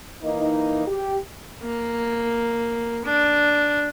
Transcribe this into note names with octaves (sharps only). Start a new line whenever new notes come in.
E3 A#3 D#4
G4
A#3
D4